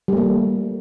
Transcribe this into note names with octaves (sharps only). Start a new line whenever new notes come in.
G3 A3 A#3